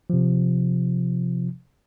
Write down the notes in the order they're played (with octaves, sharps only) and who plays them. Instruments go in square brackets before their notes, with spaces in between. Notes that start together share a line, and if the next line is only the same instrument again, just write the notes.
[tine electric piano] C3 F3